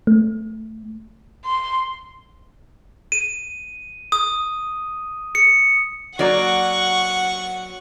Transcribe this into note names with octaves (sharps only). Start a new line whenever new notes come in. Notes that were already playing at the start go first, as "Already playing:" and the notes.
A3
C6
D#7
D#6
C#7
F#3 A#3 D5 F#5 C#6